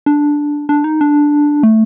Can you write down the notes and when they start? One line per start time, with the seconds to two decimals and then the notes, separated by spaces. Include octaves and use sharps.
0.06 D4
0.69 D4
0.84 D#4
1.01 D4
1.63 A3